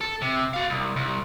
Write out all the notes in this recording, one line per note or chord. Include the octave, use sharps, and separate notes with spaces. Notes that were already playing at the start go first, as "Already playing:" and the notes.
A4
C3
F#4 F5
C2
C2